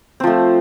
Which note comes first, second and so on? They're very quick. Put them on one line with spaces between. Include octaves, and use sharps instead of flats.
C4 F3 A3